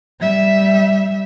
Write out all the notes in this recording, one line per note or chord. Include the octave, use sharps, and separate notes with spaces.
G3 E5